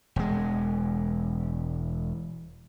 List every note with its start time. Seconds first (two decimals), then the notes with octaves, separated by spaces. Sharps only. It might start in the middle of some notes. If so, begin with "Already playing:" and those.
0.16 E1 G#3